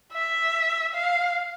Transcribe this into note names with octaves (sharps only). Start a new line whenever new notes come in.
E5
F5